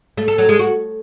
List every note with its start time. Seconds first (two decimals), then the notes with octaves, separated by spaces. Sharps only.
0.17 A3
0.28 A4
0.38 F#3
0.49 G#3
0.59 F#4